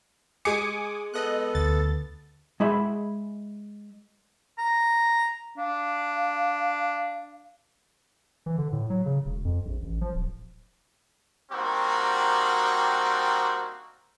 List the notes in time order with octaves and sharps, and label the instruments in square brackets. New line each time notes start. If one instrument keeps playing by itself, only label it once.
[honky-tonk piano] G#3 C#7 [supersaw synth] G#5 D6 D#6
[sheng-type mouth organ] B3 A4 [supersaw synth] D#5 F#6
[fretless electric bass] D2 [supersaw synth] A6
[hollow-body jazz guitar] G#3 E4 E5 B5
[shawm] A#5
[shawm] D4 [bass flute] F5
[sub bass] E3
D3
A2
F#3
C#3
E1
F2
A#1
A1
F3
D1
[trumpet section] G3 A#3 C4 D4 D#4 F#4